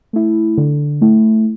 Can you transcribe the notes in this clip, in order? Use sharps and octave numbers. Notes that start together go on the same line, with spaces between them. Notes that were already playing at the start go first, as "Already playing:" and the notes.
A3 E4
D3
A3 E4